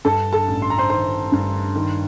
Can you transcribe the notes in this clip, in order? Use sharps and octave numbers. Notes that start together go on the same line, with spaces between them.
G2 A4 A5
A4 A5
A1
C6
A#5
C5 C6
D#3 C5 C6
G2
D#3